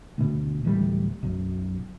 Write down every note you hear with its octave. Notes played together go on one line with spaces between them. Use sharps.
D2 B2
D1 E3 F#3 G3
B1 F#2